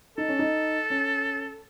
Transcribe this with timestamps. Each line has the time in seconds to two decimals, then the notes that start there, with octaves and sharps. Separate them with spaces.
0.18 D#4 A4
0.29 C#4
0.39 D#4
0.90 C#4